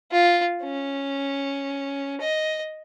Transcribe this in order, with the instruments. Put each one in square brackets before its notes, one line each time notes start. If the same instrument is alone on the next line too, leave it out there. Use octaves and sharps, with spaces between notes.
[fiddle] F4
C#4
D#5